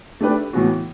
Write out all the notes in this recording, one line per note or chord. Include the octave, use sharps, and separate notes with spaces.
A3 D4 G4 B4
A2 E3 B3 F#4